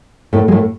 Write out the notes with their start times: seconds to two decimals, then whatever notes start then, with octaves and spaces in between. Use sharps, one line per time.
0.33 A2 A3
0.48 G#3
0.52 A2 A3